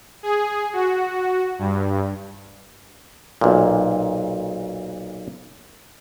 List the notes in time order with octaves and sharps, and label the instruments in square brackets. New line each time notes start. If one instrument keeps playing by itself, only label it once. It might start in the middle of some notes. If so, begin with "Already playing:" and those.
[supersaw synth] G#4
F#4
G2
[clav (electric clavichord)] B1 A#2